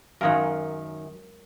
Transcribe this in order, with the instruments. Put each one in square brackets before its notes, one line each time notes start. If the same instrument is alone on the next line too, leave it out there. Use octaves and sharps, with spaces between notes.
[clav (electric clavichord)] F#2 D#3 [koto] F#3 G#3 A#4 [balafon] F5